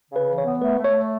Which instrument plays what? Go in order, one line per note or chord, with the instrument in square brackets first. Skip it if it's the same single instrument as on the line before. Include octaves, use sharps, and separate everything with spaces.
[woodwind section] C#3
[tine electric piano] B4
[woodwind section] E3
[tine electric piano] C#5
[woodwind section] B3
[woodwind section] A3 [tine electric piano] B4
[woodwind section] A3
[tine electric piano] C#5
[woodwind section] A3